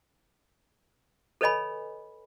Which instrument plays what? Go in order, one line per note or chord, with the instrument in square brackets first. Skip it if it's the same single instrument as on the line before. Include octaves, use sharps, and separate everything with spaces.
[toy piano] A4 B4 C#5 D#5 G#5 B5